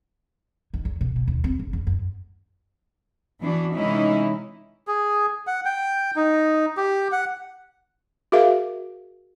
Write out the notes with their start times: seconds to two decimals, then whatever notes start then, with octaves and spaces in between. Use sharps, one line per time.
0.74 D#3
0.85 E2
1.01 B2
1.16 B2
1.28 D#2
1.44 C4
1.59 F#1
1.73 E2
1.87 F#2
3.41 E3 B3 D4 F#4
3.73 C3 E3 G#3 C#4 D#4 E4
4.87 G#4
5.47 F#5
5.65 G5
6.16 D#4
6.77 G4
7.12 F#5
8.32 F#4 G#4 A#4 E5 F5